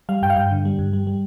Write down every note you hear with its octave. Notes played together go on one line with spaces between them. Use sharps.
G3 F5
G2 G5
F5
G2 G5
D3
G3
G2
G3
G3